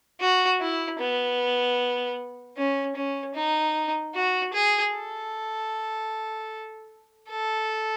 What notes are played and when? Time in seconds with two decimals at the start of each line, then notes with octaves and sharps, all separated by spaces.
0.20 F#4
0.60 E4
0.99 B3
2.57 C#4
2.95 C#4
3.35 D#4
4.15 F#4
4.53 G#4
4.93 A4
7.30 A4